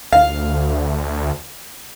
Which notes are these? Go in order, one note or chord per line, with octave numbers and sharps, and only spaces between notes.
D2 F5